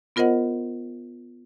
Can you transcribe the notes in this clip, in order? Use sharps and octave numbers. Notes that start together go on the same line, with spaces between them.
B3 F4 A#4 C5 D#5 F#5